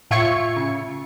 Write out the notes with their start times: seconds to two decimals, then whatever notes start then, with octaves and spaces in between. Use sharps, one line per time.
0.11 A2 F4 E5 C#6 G#6 C#7
0.57 C#3